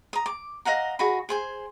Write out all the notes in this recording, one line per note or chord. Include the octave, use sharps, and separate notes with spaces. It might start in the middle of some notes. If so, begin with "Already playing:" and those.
A#5 D#6
D6
D#5 F5 F#5 A#5
F#4 G#4 D#5 B5
G#4 C5 G#5